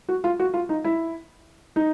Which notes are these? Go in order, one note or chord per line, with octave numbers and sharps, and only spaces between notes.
F#4
F4
F#4
F4
D#4
E4
D#4